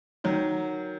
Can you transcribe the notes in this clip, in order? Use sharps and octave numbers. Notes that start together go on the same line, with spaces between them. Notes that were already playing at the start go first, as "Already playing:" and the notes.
D#3 F#3